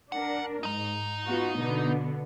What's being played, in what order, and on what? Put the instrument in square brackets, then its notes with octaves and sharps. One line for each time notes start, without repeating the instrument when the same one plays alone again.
[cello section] D4 A#4 [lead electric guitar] F#5
[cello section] G#2 [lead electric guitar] D#4 A#5
[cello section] B3 F4 F#4
B2 D3 B3